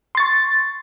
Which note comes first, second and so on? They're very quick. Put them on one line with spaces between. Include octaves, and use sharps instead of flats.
C6 A6 C#6